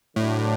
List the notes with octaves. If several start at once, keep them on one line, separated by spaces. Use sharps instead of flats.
D2 A2 D3 F#3 A3 D4